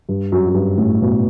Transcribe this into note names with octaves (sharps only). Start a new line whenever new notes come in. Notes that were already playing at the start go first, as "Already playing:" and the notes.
G2
F#2
F#2
G2
A2
B2